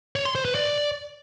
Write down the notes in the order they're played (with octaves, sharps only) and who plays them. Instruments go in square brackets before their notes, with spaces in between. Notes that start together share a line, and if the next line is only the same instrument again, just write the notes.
[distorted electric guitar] C#5
C6
C5
B4
D5